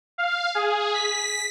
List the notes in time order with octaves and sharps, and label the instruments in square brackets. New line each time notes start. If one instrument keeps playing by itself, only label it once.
[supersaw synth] F5
G#4
B6